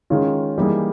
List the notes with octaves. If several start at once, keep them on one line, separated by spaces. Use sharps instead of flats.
D#3 G#3 C#4 F4
E3 G3 A#3 D#4 G#4